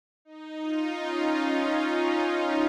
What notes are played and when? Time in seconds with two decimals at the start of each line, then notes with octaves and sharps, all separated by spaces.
0.25 D#4
0.61 F4
0.97 C#4